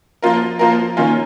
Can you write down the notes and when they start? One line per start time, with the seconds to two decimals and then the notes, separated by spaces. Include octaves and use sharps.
0.22 F3 A#3 F4 A#4
0.59 F3 A#3 F4 A#4
0.97 D#3 A#3 C#4 F4